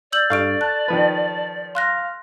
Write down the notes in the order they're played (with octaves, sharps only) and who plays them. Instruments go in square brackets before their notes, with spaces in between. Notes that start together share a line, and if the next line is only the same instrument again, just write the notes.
[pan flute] D5 [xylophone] E6 G6 F#7
[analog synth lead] G2 [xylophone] A4 C#6 D7 [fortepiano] F5
[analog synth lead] A5 [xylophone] F#6
[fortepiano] D#3 F3 B4
[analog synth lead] F5 [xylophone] C6 F#6 A#6